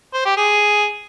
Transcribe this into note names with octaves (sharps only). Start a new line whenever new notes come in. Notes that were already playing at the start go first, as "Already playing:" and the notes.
C5
G4
G#4